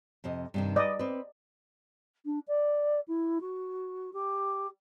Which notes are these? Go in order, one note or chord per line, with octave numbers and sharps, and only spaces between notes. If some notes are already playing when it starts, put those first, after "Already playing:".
F2 C3 D#5
G2 C3 D#3
B4 D5 D#5
C4 B4
D4
D5
E4
F#4
G4